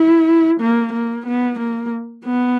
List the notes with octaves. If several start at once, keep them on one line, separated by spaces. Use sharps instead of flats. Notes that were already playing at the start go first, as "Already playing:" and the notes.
Already playing: E4
A#3
A#3
B3
A#3
B3